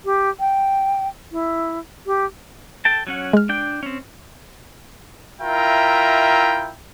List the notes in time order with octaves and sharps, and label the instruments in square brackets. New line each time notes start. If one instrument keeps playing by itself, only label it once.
[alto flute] G4
G5
E4
G4
[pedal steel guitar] A4 G5 A5
F#3 C#4 F#5
[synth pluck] G#3 F6
[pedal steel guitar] D4 G5
C4 C#4
[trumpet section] E4 F4 A#4 E5 G5 A#5